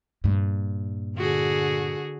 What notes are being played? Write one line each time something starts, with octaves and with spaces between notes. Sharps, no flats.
G2 A#2
D3 F#4 G#4